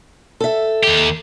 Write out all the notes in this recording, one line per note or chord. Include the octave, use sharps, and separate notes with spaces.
A4 E5
D#2 G4